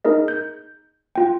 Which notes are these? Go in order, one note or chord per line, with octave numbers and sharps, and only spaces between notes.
D#4 G#4 A#4 D#5
G6
F4 G5